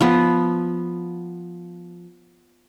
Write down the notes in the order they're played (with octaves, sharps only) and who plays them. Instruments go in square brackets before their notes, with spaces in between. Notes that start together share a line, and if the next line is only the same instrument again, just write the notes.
[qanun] F3 B3